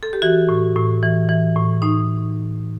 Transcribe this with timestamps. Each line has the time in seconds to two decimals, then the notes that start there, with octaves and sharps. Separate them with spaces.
0.03 A4
0.13 G4
0.22 E3 F#4
0.49 A2
0.76 A2
1.03 E3
1.29 E3
1.56 A2
1.82 A2 D#4